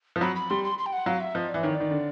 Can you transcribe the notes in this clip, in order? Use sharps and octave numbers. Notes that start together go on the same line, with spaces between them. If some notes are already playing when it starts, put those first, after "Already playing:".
F3
F#3 B5
B5
G3 C6
C6
C6
G5
F#5
F#3 F5
E5
F3 D#5
D5
E3
D#3 C#5
D5
D#3
D3